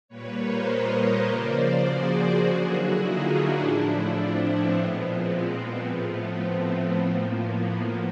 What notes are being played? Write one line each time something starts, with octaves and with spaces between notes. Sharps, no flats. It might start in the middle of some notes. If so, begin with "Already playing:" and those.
A#2 G3 A#3 B4 C#5
A#4 C5
C#5 D#5
C#3 F3 A#3 C5 D5
F#4 G#4
D3 F#3 A#3
E4 F#4
D#4 F4
D4 E4
A2 F3 A3
C4 D4
B3
A#2 F3 G#3
C4
B3
A2 F3 A3 B3
C4
A2 F3 A#3
B3